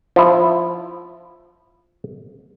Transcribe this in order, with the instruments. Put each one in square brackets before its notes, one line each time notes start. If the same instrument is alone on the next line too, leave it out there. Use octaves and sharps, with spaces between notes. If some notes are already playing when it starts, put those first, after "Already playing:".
[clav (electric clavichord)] F3 E4